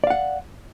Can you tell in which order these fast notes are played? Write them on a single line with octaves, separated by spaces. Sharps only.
D5 F5 F#5